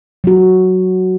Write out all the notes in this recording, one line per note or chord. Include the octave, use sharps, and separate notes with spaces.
F#3 F#4